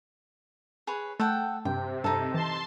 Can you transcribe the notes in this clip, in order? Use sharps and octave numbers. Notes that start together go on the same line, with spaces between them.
G#4 B4 C#5
A3 A4 F#5 G5
G2 C3 G5
G2 D#4 A4
E3 A5 C6